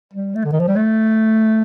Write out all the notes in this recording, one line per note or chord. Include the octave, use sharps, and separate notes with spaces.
G3
A3
D3
D#3
F3
G3
A3